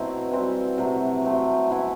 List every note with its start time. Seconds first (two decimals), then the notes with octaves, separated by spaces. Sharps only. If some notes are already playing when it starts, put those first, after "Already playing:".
Already playing: B2 F#3 A3 C4 E4
0.31 E3 G3 C4 F#4
0.78 C3 F#3 A3
1.25 F#3 A3 C4
1.71 E3 B3 E4